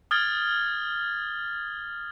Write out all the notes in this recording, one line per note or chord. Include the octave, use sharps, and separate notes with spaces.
D#6 F6 G#6 A6 G7